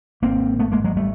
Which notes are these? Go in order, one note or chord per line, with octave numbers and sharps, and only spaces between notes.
G#1 G#2 A#3 C4
A3 B3
G#3 A#3
F#3 G#3
G3 A3